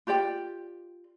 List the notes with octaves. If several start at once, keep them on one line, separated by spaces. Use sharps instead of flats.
F4 G4 D5 G5